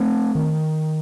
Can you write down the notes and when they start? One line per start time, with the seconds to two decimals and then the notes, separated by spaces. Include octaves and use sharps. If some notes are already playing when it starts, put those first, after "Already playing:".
Already playing: A3 C4
0.35 D#3